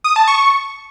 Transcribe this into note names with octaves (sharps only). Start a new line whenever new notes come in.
D#6
A5
C#6